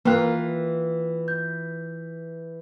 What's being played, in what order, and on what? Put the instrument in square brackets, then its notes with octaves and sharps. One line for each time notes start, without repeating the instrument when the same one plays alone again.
[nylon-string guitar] E3 F4 [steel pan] A#3 [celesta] B4 G5 F#6
[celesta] G6